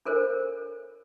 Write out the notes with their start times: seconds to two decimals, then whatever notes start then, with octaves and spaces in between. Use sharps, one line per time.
0.05 D4 A4 A#4 C5 C#5